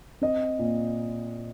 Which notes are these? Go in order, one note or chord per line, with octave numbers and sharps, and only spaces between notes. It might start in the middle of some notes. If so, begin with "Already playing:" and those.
C4 D#5
A#2